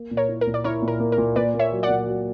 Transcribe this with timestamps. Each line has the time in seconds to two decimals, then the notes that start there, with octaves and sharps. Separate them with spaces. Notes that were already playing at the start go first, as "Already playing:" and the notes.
Already playing: A#3
0.11 A#2
0.17 A#4 C#5
0.29 E4
0.41 A#4
0.47 A#2
0.54 D5
0.64 E4 A#4 C#5
0.82 A#2
0.88 A#4
1.00 A#3
1.12 A#4
1.18 A#2
1.36 A#2 B4 D5
1.54 A#3
1.59 C#5 E5
1.72 F#3
1.83 D5 F#5
1.89 A#2
2.06 F#3